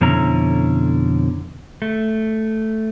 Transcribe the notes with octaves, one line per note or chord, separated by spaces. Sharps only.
F2 B2 D3 C#4 E4 A#5
A3